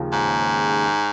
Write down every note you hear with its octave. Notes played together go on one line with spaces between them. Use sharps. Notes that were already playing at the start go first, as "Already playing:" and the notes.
Already playing: D#2 C#3 F3
G#2